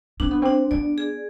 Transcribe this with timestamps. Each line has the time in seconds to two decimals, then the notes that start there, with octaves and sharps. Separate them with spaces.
0.20 C4 D4
0.31 B3
0.42 C4 D4
0.71 B3 D5
0.98 G#4